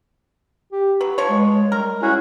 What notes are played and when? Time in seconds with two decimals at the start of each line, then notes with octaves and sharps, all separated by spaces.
0.72 G4
1.01 F#3 B4
1.18 F3 C#5
1.29 G#3
1.72 G3 A#4
2.02 C#4 E4 F#4 G#4